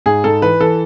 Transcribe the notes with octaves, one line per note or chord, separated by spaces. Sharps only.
G#2 G#4
G#2 A4
E3 B4
E3 A4